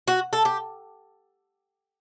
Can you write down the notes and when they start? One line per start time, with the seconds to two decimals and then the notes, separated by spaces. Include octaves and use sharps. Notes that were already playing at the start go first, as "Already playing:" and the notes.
0.07 F#4
0.33 A4
0.45 G4